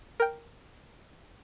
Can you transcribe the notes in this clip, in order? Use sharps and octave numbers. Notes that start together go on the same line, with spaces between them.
A#4 G5